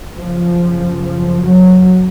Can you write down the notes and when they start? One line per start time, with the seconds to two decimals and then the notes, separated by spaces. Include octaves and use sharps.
0.17 F#2 C#3 F3
1.01 F3
1.42 F#3